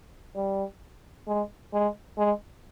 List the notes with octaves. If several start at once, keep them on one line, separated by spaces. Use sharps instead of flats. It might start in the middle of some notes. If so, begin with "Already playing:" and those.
G3
G#3
G#3
G#3